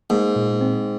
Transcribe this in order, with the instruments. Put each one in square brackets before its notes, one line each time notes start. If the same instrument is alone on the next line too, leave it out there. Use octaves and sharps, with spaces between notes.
[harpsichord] G#2 [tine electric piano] A#3
[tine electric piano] A#2
C4